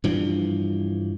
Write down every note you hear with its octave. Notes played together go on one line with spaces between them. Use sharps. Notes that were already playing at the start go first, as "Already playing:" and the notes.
G2 E3 F3